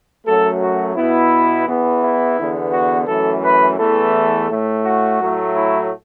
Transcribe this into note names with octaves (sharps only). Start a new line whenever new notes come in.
F#2 F#3 A3 A4
F#4
B2 B3 E4
E2 E3 B3
E4
E2 D3 B3
F#4
F#2 E3 A3 A4
B4
E2 E3 A3 A4
A2 A3
F#4
A2 F#3 A3
E4